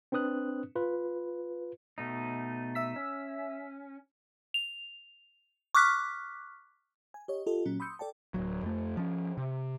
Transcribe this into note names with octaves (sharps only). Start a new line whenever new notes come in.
C4 D4 B4 D#6 F#6
F4 B4
B2 A3 D#4
E5 E6 B6
C#4
F7
C#6 D6 F6 F#6 B6
G#5
G4 C#5 D#5
F4 G4 A4 D#5
A#2 F#3 C#4
B5 C6 D#6 E6 G6 C#7
A4 D5 G5 A5
D1 G1 F#3
F2 A3
F3 C#4
C3